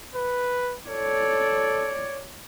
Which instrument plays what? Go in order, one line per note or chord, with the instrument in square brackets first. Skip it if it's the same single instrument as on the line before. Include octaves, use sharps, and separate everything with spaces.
[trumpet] B4
[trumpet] A4 [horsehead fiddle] C#5 D5